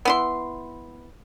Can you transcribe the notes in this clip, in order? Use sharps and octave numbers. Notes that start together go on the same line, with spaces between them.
B3 E4 C6